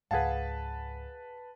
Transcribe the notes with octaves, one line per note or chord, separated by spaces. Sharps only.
C#2 G#2 G#4 B4 F5 F#5 A5